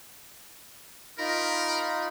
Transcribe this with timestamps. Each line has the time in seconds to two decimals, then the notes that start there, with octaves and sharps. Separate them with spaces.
1.18 D#4 F4 A#4 B5